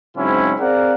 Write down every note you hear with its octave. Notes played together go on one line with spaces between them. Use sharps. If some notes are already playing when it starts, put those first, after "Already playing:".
G#2 C#3 F#3 C4 C#4 E4
C4 G#4 A#4 D5 F5 F#5